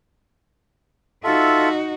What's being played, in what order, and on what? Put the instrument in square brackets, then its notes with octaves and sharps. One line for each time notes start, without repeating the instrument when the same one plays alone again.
[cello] D#4 F#4 [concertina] F4 A4 E5